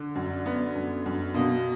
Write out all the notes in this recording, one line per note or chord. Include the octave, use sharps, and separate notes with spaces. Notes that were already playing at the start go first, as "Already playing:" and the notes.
Already playing: D3
F#2
B3
F#2
F#2
B2 A#3